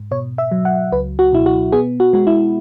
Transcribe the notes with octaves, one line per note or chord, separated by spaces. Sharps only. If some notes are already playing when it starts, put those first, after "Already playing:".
Already playing: G#2
B2 C#5
E5
F#3
F#5
C#2 B4
F#4
B2 E4
F#4
B3 G#4
F#4
G#3 F#4
E4